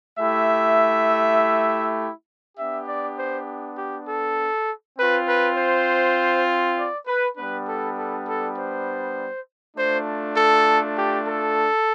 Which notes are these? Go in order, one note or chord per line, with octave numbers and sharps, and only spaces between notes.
A3 E4 G4 E5
B3 D4 G4 E5
D5
C5
G4
A4
C4 F4 B4
B4
C5
D5
B4
G3 B3 D4 B4
A4
A4
A4
C5
A3 D4 F4 C5
A4
G4
A4